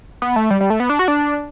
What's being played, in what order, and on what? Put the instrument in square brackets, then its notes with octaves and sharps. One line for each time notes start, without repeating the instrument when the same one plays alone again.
[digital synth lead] B3
A3
G3
G3
A3
B3
D4
F#4
D4